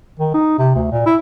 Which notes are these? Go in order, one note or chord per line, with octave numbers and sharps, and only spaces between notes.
D#3
D#4
C3
D2
A#2
E4